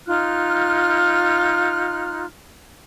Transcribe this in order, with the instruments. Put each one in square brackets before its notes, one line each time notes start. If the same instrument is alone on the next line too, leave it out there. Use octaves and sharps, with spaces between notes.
[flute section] D#4 F4 F6 F#6